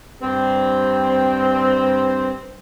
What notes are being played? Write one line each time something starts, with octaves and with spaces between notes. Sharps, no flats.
G2 C4